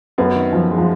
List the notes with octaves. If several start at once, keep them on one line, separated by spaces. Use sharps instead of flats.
F#2 B3
D#3
F#2 F3
G#3
F3